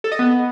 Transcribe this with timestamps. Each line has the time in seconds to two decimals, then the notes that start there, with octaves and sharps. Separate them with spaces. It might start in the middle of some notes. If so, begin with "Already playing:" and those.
0.04 A4
0.12 D#5
0.19 B3